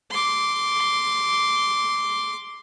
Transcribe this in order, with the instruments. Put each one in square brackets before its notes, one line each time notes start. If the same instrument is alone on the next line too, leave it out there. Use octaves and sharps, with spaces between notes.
[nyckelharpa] C6 D6